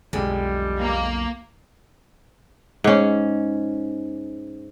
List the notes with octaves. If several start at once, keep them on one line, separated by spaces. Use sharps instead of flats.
B1 F2 D3 G3 G#3
A#3
G#2 C#4